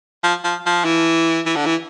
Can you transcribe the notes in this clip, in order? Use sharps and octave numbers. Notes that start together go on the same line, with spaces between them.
F3
F3
F3
E3
E3
D3
E3